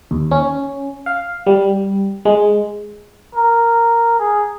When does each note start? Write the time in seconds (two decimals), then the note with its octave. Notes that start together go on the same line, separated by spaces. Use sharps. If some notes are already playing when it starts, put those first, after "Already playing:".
0.11 D#2
0.31 C#4
1.06 F5
1.47 G3
2.25 G#3
3.35 A#4
4.19 G#4